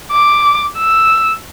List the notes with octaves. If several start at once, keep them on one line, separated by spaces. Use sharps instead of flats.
D6
E6